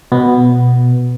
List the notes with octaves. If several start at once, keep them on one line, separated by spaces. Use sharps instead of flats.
B2 B3